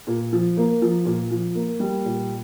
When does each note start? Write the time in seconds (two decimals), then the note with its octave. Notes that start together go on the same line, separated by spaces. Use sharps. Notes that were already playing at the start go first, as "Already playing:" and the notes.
0.07 A#2
0.32 F3
0.57 A#3
0.82 F3
1.05 A#2
1.31 F3
1.55 A#3
1.80 G3
2.04 A#2